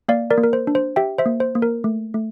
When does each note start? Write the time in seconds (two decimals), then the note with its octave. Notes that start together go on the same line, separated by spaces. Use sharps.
0.08 A#3 D5 F5
0.30 A#4 D5
0.38 A#3
0.44 A#4
0.53 C5
0.67 D4
0.75 C5
0.96 G4 E5 G5
1.18 C5 E5
1.26 A#3
1.40 C5
1.55 A#3
1.62 A#4
1.84 A3
2.14 A3